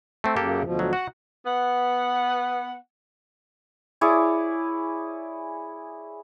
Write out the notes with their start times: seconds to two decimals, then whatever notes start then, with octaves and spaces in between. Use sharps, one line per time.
0.24 A3 C4
0.36 F#2 C#3 A#3 G4 A4
0.63 D2 B2 F3
0.79 F#3
0.93 F#4 F#5
1.45 B3 F#5
4.01 E4 G#4 C#5 D5